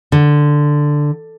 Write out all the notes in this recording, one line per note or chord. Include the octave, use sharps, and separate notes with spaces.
D3